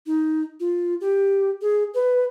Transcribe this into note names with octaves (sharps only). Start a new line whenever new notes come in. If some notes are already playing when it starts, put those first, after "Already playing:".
D#4
F4
G4
G#4
B4